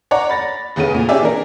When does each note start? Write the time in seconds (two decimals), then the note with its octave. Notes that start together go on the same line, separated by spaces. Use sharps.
0.11 C#5 D5 F#5 A#5
0.29 B5 A6 A#6
0.76 F1 E2 C#3 B3 C#4 D#7
0.95 A#2
1.09 C#4 G4 G#4 D5 E5
1.21 E3 D4 A#4